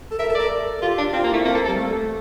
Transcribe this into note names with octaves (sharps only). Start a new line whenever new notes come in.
A4
A#4 E5
A4
A#4 D5
A4
F4 G4
D4
C4 F4
A#3
A3 E4
A#3 C4
A4
A4
G3
A3